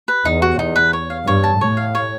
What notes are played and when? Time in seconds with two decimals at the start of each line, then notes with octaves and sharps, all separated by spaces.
0.08 B4
0.25 E2 D#4
0.42 F#4
0.59 E2 D#4
0.76 B4
0.93 C#5
1.10 F5
1.26 G2 C#5
1.44 A5
1.61 A2 C#5
1.77 F5
1.95 C#5